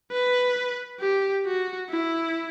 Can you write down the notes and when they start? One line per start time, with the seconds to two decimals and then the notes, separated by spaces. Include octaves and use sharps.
0.12 B4
1.01 G4
1.46 F#4
1.89 E4